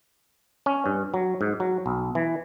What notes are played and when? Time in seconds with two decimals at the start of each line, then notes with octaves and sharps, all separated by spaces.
0.66 C#4
0.86 G2
1.14 F#3
1.41 G#2
1.60 F#3
1.86 B1
2.15 E3